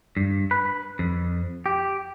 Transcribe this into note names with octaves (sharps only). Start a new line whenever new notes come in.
G2
B4
F2
G4